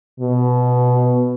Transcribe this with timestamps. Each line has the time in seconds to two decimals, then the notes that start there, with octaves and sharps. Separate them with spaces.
0.20 B2